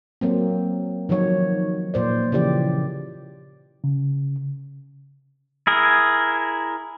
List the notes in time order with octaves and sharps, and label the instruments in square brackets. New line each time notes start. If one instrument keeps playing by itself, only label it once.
[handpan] F#3 A#3 C4
D#3 F3 F#3 C#5
A#2 C5 D5
C#3 E3 F3 G4 D5
[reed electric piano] C#3
[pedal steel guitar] E4 G#4 A#4